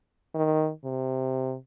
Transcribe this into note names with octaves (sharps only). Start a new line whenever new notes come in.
D#3
C3